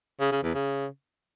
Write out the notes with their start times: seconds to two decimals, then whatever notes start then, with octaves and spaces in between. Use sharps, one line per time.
0.20 C#3
0.32 C#3
0.43 E2
0.54 C#3